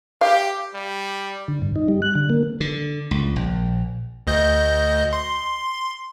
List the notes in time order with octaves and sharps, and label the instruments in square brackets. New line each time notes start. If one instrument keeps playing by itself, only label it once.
[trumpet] G4 [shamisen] F5
[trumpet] G3
[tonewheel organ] D3
G2
D#4
G3
F#6
D3
A#3
[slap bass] D3
C#2
A#1
[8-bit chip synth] D2 D#5 G6
C6